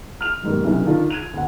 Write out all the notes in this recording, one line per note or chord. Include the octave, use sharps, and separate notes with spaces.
F6 F7
B1 G#2 D#3 G3 A#3
B1 C3 B3 C#4 D4 E4
D3 D#3 D4 F4
G#6 D#7 F7
D2 F#5